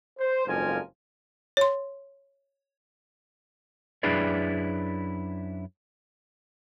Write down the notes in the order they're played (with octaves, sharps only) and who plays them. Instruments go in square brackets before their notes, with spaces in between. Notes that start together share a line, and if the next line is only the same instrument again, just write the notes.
[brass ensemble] C5
F#1 F2 G#2 F3 A#4 G#5
[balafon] C#5 C6
[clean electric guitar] F#2 D4 E4 G#4 B4 D5